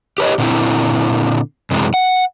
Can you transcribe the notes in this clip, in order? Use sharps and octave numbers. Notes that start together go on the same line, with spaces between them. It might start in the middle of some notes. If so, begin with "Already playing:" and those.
G4 B4 C#5 D#5
A#2 D3 C4 E4
F#2 C3 E3 F#3 G#3
F#5